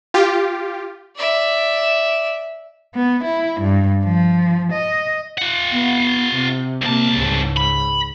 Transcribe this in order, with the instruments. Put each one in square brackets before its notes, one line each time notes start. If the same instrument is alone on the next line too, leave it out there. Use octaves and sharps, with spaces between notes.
[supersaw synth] F4 G4
[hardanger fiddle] D5 E5
[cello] B3
E4
G2
F3
D#5
[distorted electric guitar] F4 F#5
[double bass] B3
C3
[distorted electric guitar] C2 A5 [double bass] C3 A#3
[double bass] C#2 G#2
[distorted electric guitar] B5